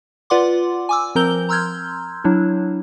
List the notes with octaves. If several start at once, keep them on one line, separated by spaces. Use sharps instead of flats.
F4 B4 D5 F#5 C6 D6
G#5 D6 E6
F3 C4 A#4 A#5 G6 G7
A#5 C6 E6 F6 G6 G#6
F#3 D4 E4